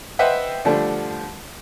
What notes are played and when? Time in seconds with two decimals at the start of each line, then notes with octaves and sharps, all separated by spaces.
0.19 B4 C5 D#5 E5 F#5 G5
0.65 D3 F3 G3 A3 D4